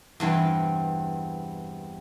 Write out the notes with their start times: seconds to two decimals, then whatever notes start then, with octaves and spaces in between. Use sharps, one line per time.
0.20 E2 G2 C3 E3